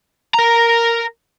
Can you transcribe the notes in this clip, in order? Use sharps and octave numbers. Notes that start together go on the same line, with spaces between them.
A#4 A#5